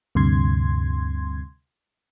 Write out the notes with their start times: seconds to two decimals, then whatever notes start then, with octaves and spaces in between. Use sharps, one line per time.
0.15 D2 G2 C3 C6 G#6